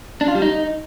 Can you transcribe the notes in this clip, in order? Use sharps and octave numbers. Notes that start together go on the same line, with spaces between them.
D4
F4
G3
D#4